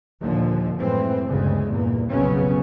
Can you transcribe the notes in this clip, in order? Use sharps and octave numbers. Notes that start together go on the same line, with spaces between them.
D#2 A#2 D3 F3
F#2 A2 E3 G#3 C4
G1 D2 C#3 G#3
E2 G2 A#2 A#3
F1 B1 C#3 F#3 B3 C#4